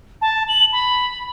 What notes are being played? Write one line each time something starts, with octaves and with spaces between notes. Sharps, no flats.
A5
F#7
B5